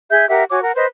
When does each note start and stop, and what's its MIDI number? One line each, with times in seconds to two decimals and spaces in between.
0.11 0.28 68
0.11 0.28 76
0.11 0.28 91
0.29 0.44 67
0.29 0.44 70
0.29 0.44 76
0.29 0.44 78
0.50 0.60 66
0.50 0.60 73
0.50 0.60 80
0.50 0.60 86
0.62 0.72 70
0.62 0.72 78
0.75 0.85 71
0.75 0.85 72
0.75 0.85 75